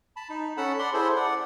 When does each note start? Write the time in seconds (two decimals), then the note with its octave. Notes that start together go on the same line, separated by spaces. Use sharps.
0.16 A5 B5
0.30 D#4
0.57 C#4 A4 F#5 A5 B5
0.79 D5 F#5 B5 C6
0.94 E4 G#4 A4 C5
1.16 D5 F#5